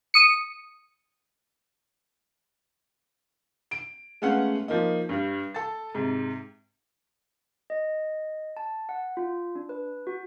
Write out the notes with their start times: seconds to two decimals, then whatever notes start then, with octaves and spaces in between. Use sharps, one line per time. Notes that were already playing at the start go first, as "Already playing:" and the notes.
0.14 D#6 C#7
3.71 D7
4.22 G#3 A3 B3 C#4 F5 F#5
4.68 F3 A#3 D#4
5.09 G2 G3
5.54 A4 A6
5.95 G#2 C3
7.70 D#5
8.57 A5
8.89 F#5
9.17 F4
9.55 D4
9.69 B4
10.07 F#4